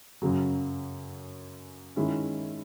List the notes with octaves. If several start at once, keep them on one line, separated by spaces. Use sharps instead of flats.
F#2 C#3 F#3
D#3 G#3 C#4 E4